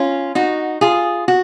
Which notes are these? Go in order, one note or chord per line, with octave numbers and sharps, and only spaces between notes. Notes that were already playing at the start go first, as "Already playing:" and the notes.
Already playing: C#4 F4
D#4 F#4
F4 G#4
F#4